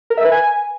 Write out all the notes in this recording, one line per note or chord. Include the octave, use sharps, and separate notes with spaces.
A#4
E5
B4
G#5